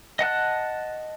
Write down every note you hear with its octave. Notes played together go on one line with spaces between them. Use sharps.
D#5 F#5 A5 F#6